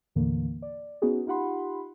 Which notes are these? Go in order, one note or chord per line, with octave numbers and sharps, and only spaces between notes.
D#2 A2 D3 E3 A#3
D5
B3 C#4 D#4 F#4 G#4
D#4 F4 G4 F#5 B5 C6